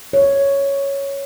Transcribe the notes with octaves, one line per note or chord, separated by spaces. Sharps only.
C#5